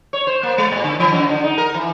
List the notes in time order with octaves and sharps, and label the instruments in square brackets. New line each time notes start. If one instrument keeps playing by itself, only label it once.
[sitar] C#5
C5
A#3
G#3
A#2
D3
E3
F#2
D3
D#4
A#4
E3